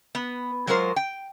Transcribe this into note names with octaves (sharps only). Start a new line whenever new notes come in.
B3
F#3 G#3 F4 A#4 C5
G5